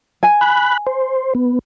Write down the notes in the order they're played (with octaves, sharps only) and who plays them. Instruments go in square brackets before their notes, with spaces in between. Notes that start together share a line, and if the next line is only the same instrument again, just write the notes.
[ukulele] G#5
[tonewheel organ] B5 F#6
C5
B3